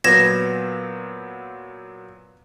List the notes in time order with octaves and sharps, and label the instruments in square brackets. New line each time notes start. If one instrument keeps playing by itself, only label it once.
[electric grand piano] A#2 F#3 B3 [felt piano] B4 [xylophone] G#6 A#6 E7